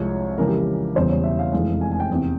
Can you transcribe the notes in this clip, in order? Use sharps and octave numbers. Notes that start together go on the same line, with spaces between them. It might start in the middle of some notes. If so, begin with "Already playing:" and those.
Already playing: C2 C3 F3 G#3 C#5
F2 C#3 E3 G#3 A#4
G4
A#4
E1 E2 C#3 E3 G3 C5
C#5
E5
F5
F1 F2 E3 G#3
G#5
G#5
G5
F1 E2 C3